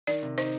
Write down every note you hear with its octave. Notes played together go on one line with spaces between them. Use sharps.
D#3 D5
C3
D#4 C5